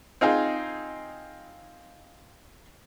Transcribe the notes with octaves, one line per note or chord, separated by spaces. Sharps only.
C4 D#4 F4 G#4